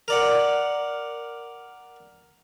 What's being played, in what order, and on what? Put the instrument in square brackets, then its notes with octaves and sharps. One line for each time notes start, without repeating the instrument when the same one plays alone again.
[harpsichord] A#4 D5 F#5